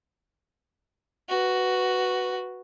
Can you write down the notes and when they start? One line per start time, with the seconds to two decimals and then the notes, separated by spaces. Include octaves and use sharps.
1.29 F#4 B4